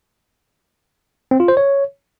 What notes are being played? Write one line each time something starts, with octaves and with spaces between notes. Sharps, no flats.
C4
F4
C5
C#5